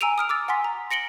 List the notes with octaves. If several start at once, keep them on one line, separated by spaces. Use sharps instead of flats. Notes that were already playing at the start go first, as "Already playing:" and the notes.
G#5 A#5 E6 D7 D#7 F7
D#6 F6 D7
D6 E6 A6
F#5 G#5 C6 B6
A#5
A#6 C#7 D7 F#7 G7